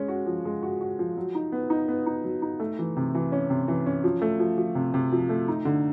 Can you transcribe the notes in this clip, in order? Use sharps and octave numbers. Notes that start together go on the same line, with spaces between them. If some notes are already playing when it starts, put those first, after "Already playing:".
Already playing: G#3 C#4
F#4
F3
G#3
F#4
F#4
F3
F#3
D#4
B3
D#4
B3
D#4
F#3
D#4
A3
E3
C3
E3
C#4
C3
E3
C#4
F3
A3
F3
F3
C3
C3
F3
A3
D#4
D3